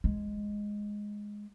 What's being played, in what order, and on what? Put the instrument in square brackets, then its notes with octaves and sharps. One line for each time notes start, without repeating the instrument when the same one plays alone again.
[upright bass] G#3